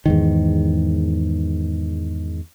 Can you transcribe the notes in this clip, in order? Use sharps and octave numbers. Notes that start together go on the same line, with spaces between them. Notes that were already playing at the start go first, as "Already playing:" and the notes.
E2 G#2 D#3